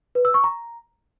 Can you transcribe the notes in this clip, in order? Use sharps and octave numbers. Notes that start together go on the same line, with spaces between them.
B4
E6
C#6
A#5